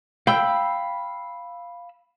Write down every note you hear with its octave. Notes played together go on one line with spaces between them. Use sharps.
F5 G5 B5 E6